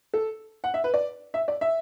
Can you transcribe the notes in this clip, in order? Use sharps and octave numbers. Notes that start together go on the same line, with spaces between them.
A4
F#5
E5
B4
D5
E5
D5
E5